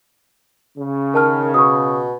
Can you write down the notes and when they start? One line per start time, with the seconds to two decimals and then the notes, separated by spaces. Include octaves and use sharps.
0.77 C#3
1.14 D#3 A#4 A5 F6
1.54 B2 C#6 D#6